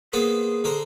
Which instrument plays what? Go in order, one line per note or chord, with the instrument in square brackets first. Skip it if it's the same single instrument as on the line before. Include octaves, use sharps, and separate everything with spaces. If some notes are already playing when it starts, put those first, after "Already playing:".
[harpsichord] A#3 B3 C5 [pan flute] G#4
[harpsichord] D3 A#4 C5